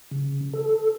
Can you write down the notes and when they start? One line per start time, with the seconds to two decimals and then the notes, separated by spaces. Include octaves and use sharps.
0.11 C#3
0.53 A4